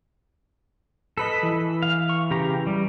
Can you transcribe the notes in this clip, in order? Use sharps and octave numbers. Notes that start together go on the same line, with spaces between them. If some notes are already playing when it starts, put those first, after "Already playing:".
A4 B4 D#5 B6
E3
F5
C#6
C#3 G4 A#5
G3